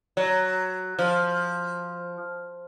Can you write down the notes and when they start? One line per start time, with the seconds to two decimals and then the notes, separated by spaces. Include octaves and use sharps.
0.17 F#3
0.99 F3